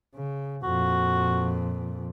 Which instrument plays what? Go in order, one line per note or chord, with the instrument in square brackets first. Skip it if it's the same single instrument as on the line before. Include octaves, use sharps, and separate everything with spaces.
[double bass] C#3
[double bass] F2 A#2 [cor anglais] F#4